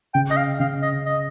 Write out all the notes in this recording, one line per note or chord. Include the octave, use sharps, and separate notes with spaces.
C#3 G5
D#5
F5
C#3 F5
D#5
D#5